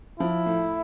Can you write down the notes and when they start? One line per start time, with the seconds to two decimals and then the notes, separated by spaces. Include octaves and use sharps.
0.20 F3 E4
0.46 A2